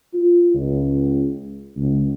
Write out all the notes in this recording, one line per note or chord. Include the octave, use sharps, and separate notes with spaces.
F4
C#2
C#2